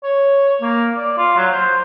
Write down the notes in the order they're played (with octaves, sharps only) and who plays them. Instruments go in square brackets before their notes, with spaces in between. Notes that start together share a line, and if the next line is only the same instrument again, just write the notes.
[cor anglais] C#5
A#3
D5
F4
F#3
C5